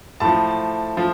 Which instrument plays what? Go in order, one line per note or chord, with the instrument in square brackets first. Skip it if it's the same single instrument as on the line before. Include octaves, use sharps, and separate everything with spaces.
[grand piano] A2 F3 A5
F3